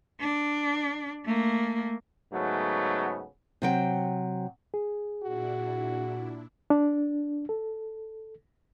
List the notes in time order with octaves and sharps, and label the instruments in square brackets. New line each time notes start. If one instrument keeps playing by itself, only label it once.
[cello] D4
A3 A#3
[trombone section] G#2 C#3 F#3 A3 B3
[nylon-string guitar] C3 F#3 G5
[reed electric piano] G#4
[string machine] A#2 D4 E4 [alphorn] F#4
[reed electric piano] D4
A4